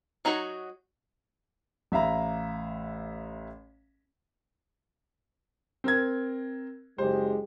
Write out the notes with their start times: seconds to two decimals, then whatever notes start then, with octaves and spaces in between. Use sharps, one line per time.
0.25 F#3 D#4 F#4 C#5
1.92 A1 E5 F5 A#5 B5
5.84 C4 A#4 G#6
6.98 F#1 G#3 G4 C5